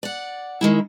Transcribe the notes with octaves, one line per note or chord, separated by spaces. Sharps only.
D5 F#5
D#3 G#3 E4